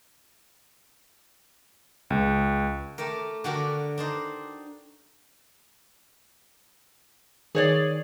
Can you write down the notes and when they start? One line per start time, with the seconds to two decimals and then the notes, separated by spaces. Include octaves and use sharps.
2.10 C#2
2.98 A3 G4 A#4
3.44 D3 D4 F#4 G4 A#4
3.98 D4 D#4 C5
7.55 D#3 G#4 C#5 D5